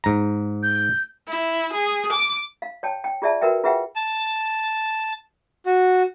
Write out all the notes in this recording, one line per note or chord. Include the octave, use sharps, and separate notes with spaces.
G#2 A#5
G6
E4
G#4
D6
F5
C#5 G5 A5
G5
F4 G#4 D5 E5 A5
F#4 A#4 B4 E5 G5
F4 G#4 B4 E5 F#5 G5
A5
F#4